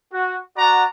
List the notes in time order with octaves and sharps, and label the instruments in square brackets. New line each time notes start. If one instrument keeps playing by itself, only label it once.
[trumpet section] F#4
F#4 D5 F#5 A#5